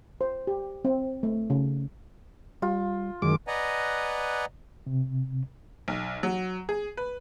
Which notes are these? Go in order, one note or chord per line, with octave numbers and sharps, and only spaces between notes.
C5
G4
C4
A3
C#3
G3 F4
F#2 D#3 G#3 D6
B4 D5 D#5 F#5 G#5 A#5
C3
B1
F#3
G#4
B4